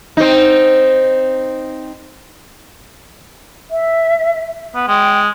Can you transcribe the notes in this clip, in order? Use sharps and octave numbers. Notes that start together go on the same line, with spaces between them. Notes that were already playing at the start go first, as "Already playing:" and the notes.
C4 D#4
E5
B3
G#3 G5